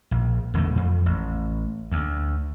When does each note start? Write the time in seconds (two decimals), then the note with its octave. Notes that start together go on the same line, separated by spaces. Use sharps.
0.11 A#1
0.54 E1 E2 D3 A3
0.76 F2
1.06 A1
1.92 D2